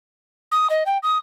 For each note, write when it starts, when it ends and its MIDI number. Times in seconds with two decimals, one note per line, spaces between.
0.52 0.68 87
0.70 0.84 75
0.86 0.98 79
1.03 1.18 87